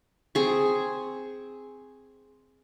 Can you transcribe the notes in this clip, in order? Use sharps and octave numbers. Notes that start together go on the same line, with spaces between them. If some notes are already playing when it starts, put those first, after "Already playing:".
C4 G#4 C#6